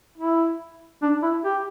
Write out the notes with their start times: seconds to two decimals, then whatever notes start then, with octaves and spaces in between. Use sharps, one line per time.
0.18 E4
1.02 D4
1.23 E4
1.44 G4